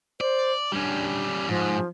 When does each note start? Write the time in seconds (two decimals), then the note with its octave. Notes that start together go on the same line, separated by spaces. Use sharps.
0.21 C5 D5
0.72 G3 C#4 D4
1.48 G#2 F3